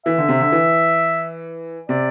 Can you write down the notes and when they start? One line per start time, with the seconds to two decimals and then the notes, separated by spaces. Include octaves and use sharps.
0.06 E3 E5
0.18 D3
0.29 C3
0.40 D3
0.52 E3
1.89 C3 D5